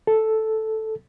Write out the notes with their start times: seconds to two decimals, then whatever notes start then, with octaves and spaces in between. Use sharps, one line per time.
0.07 A4